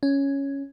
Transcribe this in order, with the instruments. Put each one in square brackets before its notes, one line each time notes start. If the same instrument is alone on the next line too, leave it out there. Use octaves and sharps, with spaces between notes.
[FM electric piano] C#4